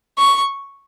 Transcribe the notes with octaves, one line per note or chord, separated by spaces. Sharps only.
C#6